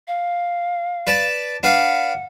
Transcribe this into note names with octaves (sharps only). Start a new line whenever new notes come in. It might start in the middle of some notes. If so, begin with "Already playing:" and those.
F5
B4 D5 A5
D4 B4 F5 F#5